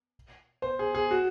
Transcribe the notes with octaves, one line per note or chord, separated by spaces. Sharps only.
C5
G#4
G#4
F#4